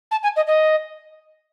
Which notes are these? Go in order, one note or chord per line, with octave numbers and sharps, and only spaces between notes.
A5
G#5
D#5
D#5